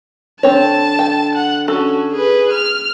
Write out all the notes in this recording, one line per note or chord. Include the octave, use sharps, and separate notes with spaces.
D3 C4 C#5 A5
G5
F#5
C#4 F#4 A4
G#4 B4
F6